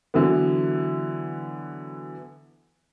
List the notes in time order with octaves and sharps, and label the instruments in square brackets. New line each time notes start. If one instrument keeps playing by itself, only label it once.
[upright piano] D3 E3 F#3 B3